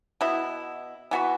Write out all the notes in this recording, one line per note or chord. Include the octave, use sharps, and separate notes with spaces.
B2 B3 E4
E3 B3 F#4 B4